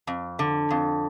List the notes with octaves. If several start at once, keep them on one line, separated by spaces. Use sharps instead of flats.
F2
D3
F2